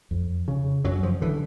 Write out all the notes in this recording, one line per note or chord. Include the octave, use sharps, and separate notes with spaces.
F2
C#3
F#2 F#3
F3
D3 E3